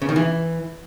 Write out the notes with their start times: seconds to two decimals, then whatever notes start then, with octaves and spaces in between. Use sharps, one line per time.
0.02 C#3
0.09 D#3
0.16 E3